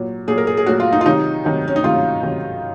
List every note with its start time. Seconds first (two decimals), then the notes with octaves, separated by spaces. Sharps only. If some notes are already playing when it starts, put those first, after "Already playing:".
Already playing: A#2 F#3
0.28 A#2 F#3 G#4
0.38 A#4
0.47 G#4
0.57 G#4
0.66 A#2 F#3 F#4
0.80 F4
0.93 D#4
1.01 F4
1.05 C3 D#3 F#3 D#4
1.45 C3 D#3 F#3
1.68 C#4
1.76 D#4
1.84 C3 D#3 F#3 F4
2.23 C3 D#3 F#3